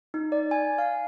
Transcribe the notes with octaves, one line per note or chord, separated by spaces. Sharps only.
D#4
D5
G#5
F5